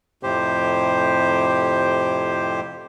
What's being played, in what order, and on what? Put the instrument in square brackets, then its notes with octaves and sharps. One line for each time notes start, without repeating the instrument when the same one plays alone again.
[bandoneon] F2 A2 C3 G4 C5